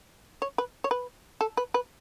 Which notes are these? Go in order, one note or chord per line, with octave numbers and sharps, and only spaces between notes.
C#5
B4
C#5
B4
A4
B4
B4